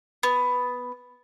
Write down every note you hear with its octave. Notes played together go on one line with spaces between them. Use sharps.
B3